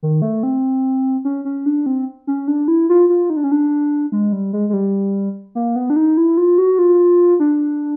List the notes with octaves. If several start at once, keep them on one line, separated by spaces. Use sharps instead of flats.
D#3
A3
C4
C#4
C#4
D4
C4
C#4
D4
E4
F4
F4
D#4
D4
C#4
D4
G#3
G3
G#3
G#3
G3
A#3
B3
D4
D#4
E4
F4
F#4
F4
D4